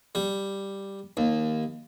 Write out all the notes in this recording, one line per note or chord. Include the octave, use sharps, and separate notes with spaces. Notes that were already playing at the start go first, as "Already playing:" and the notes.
G3
D#2